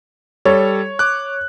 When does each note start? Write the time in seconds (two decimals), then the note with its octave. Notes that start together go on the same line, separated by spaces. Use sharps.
0.45 G3 A4 C#5
0.99 D6 F#6